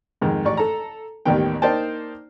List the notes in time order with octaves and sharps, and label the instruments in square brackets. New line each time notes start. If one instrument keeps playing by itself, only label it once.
[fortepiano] F2 G#2 D#3
A1 D5 C#6
A4 A#5
A1 D#2 D#3 G3 B3 G5
A#3 D#4 C5 D5 G5 A5